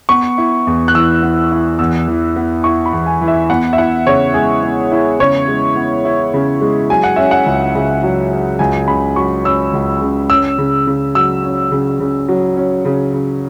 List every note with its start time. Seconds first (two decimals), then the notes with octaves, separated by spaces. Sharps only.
0.09 B3 C#6
0.38 E4
0.67 E2
0.88 F#6
0.95 E3 E6
1.22 B3
1.51 E4
1.79 E2 E6
2.08 E3
2.36 B3
2.64 E4 C#6
2.86 B5
2.93 E2
3.06 G#5
3.21 E3
3.28 E5
3.50 B3 F#5
3.73 E5
3.78 E4 F#5
4.06 C#3 C#5
4.34 G#3 G#4
4.63 B3
4.92 E4
5.20 C#3 C#5
5.48 G#3
5.76 B3
6.05 E4
6.34 C#3
6.61 G#3
6.90 F#3 G#5
7.04 F#5
7.16 C#4 E5
7.31 F#5
7.46 C#2
7.75 C#3
8.03 F#3
8.32 C#4
8.59 C#2 G#5
8.88 C#3 B5
9.16 F#3 C#6
9.44 C#4 E6
9.73 C#2
10.01 C#3
10.30 C#4 E6
10.58 C#3
10.87 C#3
11.15 F#3 E6
11.44 C#4
11.71 C#3
12.00 C#3
12.28 F#3
12.56 C#4
12.85 C#3
13.13 C#3